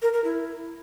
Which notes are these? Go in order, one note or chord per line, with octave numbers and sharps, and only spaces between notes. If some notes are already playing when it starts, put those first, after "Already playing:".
A#4
A#4
E4